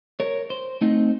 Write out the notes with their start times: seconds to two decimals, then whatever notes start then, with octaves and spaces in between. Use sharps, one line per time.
0.20 A#4 C#5
0.50 C5
0.81 A3 C4 D#4